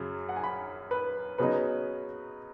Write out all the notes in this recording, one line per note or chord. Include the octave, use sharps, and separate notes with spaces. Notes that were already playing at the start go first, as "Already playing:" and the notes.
Already playing: F#2 C#3 F#3
F#5
G#5
B5
B4
C#3 F#3 B3 D#4 B4